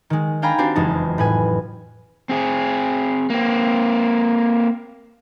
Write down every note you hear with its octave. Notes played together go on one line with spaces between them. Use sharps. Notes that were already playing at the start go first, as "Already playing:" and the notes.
D#3 G#3
D4 F5 G5 G#5 A#5 B5
C4 D4 F#4 G4 C5
F#1 F2 E3 G#3 D#4 A5
A2 B4 G#5
C4 G#4
A#3 C4